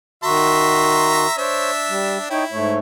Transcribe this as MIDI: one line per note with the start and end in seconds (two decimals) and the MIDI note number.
0.24 1.27 51
0.24 1.27 66
0.24 1.34 76
0.24 1.34 82
0.24 1.34 84
1.38 2.26 62
1.38 1.71 72
1.38 1.71 73
1.38 2.26 76
1.89 2.18 55
2.31 2.44 63
2.31 2.74 64
2.31 2.44 73
2.31 2.44 79
2.52 2.79 44
2.52 2.79 57
2.52 2.79 73